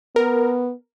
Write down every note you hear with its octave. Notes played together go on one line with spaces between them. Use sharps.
B3 A#4